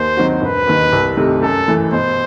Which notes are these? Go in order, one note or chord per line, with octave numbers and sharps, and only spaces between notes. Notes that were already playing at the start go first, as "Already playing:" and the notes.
Already playing: D#2 C5
D#3 F#3 C4 F#4
E1 B4
D#2 D#3
C2
C3 D#3 A3
F#2 A4
E3 A3
B2 C5